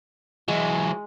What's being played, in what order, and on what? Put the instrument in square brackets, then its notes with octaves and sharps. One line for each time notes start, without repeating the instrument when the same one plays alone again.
[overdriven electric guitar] E3 F#3 [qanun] G#3